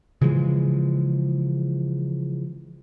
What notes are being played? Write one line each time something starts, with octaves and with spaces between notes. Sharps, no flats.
C#3 E3 F3 G#3